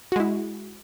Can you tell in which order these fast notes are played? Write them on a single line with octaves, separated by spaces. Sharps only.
F#4 G#3 E4